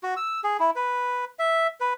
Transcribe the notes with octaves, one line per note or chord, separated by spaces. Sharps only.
F#4
E6
G#4
E4
B4
E5
B4